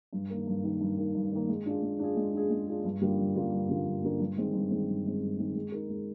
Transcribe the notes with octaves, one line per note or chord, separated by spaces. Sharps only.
G2
D#3 A#3
G2
D#3 A#3
G2
D#3 A#3
G2
D#3 A#3
G#3
D4 F4 G#4
G#3
D4 F4 G#4
G#3
D4 F4 G#4
G#3
D4 F4 G#4
G2
D3 G3 A#3 F4
G2
D3 G3 A#3 F4
G2
D3 G3 A#3 F4
G2
D3 G3 A#3 F4
G2
D#3 G#3 C4
G2
D#3 G#3 C4
G2
D#3 G#3 C4
G2
D#3 G#3 C4
G#3
D#4 A#4
G#3